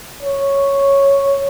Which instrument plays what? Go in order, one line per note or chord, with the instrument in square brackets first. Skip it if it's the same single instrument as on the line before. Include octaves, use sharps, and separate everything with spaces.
[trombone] C#5